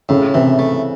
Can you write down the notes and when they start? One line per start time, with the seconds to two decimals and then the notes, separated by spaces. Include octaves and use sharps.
0.09 A2 C#3
0.34 C3 E3
0.59 A3